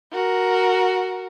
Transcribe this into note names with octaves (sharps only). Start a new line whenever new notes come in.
F#4 A#4